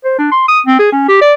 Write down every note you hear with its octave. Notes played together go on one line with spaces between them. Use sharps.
C5
D4
C6
D#6
C4
G#4
C#4
G4
D5